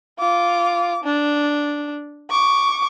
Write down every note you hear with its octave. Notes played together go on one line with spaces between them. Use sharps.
F4 D6
D4
C#6 D6